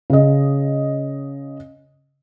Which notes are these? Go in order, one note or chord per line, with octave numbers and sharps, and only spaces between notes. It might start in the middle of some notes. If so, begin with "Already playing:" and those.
C#3 D#5